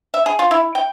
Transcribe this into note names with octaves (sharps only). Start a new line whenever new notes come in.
E5
G#4
F4
E4
G5